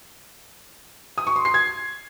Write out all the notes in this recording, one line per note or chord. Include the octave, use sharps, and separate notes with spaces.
D#6
C#6
C6
C7
G#6